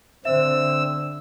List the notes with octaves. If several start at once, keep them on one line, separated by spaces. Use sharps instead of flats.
D3 C4 C5 E5 E6